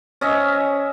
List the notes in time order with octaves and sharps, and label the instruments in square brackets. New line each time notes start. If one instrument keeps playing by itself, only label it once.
[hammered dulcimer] C#4 D#5 E5